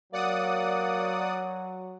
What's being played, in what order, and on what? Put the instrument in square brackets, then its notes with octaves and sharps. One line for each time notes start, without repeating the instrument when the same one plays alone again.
[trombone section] F#3 [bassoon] A#3 [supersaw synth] D5 F#5 D#6